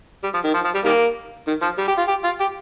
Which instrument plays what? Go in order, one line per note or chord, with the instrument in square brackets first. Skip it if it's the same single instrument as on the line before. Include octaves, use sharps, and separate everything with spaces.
[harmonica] G3
F3
D#3
F3
F3
G3
D#3 G3 A#3
D#3
F3
G3
G4
F4
G4
F4
G4